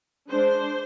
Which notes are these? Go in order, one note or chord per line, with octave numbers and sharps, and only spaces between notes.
G#3 D4 C5